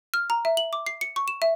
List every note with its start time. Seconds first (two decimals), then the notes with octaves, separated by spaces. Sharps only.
0.14 F6
0.30 A#5
0.45 E5
0.57 F#7
0.73 D6
0.86 C7
1.01 C#7
1.16 C#6
1.28 E7
1.42 E5